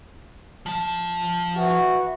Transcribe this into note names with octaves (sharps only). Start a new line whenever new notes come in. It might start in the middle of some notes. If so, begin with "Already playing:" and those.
F3 A5
E3 F#4